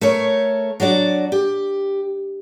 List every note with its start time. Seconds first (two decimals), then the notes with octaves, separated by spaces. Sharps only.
0.01 A3 A#4 C#5
0.80 F#3 D4 F#4 D5
1.32 G4